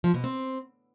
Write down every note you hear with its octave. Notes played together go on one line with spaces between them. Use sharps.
F3
B2
C4